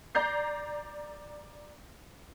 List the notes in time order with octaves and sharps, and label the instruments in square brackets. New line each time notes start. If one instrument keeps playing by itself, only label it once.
[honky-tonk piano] D5 A#5 G6 C7